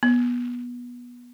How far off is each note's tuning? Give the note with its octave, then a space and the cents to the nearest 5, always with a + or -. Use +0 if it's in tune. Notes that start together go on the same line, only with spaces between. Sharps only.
B3 -20